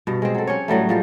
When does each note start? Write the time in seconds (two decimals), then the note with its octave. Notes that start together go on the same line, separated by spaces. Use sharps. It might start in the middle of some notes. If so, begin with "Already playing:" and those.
0.07 G2 B2
0.22 G#3 C4
0.35 F#3 A4
0.47 C#4 G4 C#5
0.68 A2 F#3 G3 A3
0.89 F3 G3 G#3